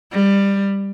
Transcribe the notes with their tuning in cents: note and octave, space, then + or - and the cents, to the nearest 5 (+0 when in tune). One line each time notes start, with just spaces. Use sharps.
G3 +15